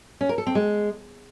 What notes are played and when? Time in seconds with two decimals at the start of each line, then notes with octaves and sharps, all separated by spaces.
0.21 C#4
0.29 A#4
0.38 A4
0.47 C4
0.55 G#3